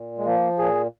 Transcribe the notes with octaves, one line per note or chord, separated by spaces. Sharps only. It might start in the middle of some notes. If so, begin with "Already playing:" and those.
Already playing: A#2
G#3
F3 A#3
A#2 G#4